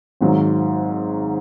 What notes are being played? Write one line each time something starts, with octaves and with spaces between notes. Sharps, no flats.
G#1 G#2 F#3